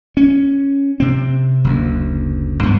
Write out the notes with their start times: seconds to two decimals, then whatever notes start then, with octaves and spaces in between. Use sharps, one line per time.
0.17 C#4
1.00 C3 C4
1.64 F#1 D2
2.63 G2 B3